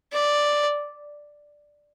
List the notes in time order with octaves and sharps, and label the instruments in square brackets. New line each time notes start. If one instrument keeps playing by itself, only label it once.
[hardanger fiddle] D5